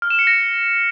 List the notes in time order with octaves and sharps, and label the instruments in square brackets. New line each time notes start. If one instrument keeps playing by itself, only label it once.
[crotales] F6
E7
C#7
A#6